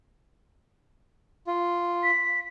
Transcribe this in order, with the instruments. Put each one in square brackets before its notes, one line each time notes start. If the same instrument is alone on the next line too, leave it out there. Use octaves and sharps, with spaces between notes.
[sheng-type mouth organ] F4
[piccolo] B6